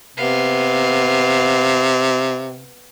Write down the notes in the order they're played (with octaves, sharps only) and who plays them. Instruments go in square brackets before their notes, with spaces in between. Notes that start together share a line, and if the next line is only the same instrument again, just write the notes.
[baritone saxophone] C3 [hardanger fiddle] B3 F5